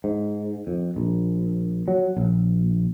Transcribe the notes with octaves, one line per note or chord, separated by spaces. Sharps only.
G#2
F2
A#1
F#3
A#1